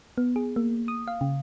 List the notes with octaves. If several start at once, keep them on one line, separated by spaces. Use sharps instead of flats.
B3
G#4
A#3
D#6
F5
C#3